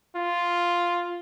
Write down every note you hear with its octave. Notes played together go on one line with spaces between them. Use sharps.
F4